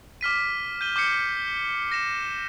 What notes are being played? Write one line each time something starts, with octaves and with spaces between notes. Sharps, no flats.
D6 F6 B6 D#7
G6 D#7 G7
D6 G6 C7 C#7
A#6 C#7 E7